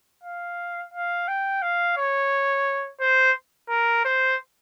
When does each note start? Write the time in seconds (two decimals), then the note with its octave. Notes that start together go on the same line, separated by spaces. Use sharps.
0.24 F5
0.94 F5
1.28 G5
1.62 F5
1.97 C#5
3.01 C5
3.70 A#4
4.05 C5